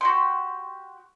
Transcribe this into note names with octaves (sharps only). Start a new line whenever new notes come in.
F#4 G4 C6